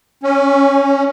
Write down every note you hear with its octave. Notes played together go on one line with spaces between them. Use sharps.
C#4